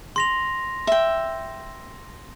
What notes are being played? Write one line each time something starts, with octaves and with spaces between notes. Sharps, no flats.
C6 A#6 F7
E5 G5